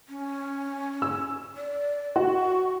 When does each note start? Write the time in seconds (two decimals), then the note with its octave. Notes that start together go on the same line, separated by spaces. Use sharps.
0.09 C#4
1.02 E6
1.57 D5
2.16 F#4 C#6